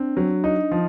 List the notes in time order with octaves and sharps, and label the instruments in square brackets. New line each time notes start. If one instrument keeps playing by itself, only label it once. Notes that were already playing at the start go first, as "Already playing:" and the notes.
Already playing: [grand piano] C4 [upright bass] D4
[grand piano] F#3
D#4
F3